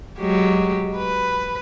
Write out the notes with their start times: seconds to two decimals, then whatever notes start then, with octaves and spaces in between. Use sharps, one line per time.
0.19 F#3 G#3 G4
0.97 B4